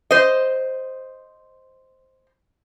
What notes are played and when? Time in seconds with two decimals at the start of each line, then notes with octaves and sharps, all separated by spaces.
0.11 C5 D#5